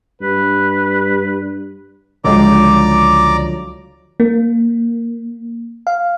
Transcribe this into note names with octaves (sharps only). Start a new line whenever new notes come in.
G2 B4
C#2 D3 F3 F#3 G#3 D5 A#5 D6
A#3
F5